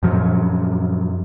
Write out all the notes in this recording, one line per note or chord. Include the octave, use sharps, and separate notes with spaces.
F#2 A#2 F3 F#3